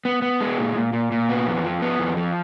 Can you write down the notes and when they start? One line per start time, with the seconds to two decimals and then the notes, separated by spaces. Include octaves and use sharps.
0.05 B3
0.22 B3
0.41 G#3
0.58 A#2
0.76 A#2
0.93 A#2
1.12 A#2
1.29 B3
1.47 F2
1.64 F3
1.82 B3
1.99 F2
2.17 F3